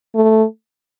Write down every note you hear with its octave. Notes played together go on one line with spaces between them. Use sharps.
A3